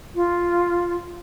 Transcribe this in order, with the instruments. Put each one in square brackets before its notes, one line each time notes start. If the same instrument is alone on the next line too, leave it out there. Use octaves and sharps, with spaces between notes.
[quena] F4